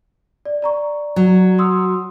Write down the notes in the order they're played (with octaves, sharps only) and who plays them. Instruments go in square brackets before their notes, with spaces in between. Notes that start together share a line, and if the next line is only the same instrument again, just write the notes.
[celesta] D5
D5 A#5 C#6
[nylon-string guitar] F#3
[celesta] C6 D#6 E6